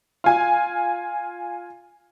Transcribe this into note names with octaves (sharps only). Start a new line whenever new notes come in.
F4 G#5